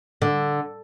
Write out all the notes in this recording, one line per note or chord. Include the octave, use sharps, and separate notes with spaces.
D3